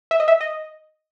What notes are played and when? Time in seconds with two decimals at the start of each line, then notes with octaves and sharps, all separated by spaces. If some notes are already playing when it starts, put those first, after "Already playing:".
0.11 E5
0.20 D#5
0.28 E5
0.41 D#5